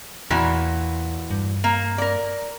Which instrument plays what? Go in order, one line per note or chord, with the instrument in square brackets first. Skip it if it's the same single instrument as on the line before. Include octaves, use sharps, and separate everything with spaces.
[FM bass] E2 [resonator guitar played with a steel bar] A#2 E3 F#4
[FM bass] G2
[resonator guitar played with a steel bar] A#3
A#4 D5